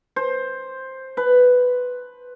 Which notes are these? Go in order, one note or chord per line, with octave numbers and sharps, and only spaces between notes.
C5
B4